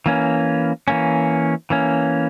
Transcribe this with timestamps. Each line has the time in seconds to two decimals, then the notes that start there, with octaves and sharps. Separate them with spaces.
0.06 E3 A#3 C#4
0.88 E3 A#3 C#4
1.70 E3 A#3 C#4